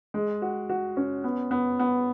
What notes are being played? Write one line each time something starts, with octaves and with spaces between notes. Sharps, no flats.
G#3
F#4
F#4
C#4
B3
B3
B3